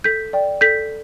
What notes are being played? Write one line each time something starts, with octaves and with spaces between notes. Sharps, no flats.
A4 G6 B6
D5 G5
A4 G6 B6